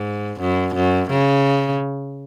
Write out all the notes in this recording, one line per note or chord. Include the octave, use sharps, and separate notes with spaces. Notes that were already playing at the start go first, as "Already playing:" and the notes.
Already playing: G#2
F#2
F#2
C#3